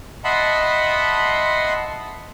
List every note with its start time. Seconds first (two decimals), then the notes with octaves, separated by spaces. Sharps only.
0.24 D#5 E5 F#5 A5 B5 C6